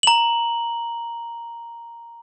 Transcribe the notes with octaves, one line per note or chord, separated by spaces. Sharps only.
A#5 F#7